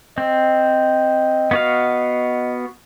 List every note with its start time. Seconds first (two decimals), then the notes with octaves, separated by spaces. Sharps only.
0.18 C4 D#5
1.51 B3 F#4 F5